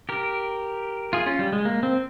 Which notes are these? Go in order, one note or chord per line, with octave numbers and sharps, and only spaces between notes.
G4 A#4
F4 G#4
C#4 F4
G3
G#3
A#3
C4